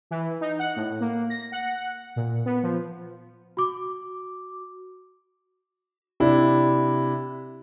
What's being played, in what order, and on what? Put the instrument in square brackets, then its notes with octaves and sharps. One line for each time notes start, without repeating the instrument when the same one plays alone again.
[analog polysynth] E3
D#4
F#5
A2
A#3
A#6
F#5
A#2
B3
F3
[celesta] F#4 D6
[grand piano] C3 D4 E4